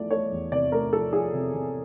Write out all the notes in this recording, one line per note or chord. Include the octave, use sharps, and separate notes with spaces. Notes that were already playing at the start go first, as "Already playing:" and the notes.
Already playing: E2 F3 A3 D5
A3 C#5
E2
C3 D5
A3 A#4
F3 A4
F3 G#4
C3
C3